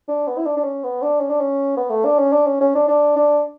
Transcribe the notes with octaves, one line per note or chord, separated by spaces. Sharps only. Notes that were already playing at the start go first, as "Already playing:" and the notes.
D4
B3
E4
D4
D4
C#4
B3
D4
C#4
D4
C#4
B3
A3
D4
C#4
D4
C#4
C#4
D4
D4
D4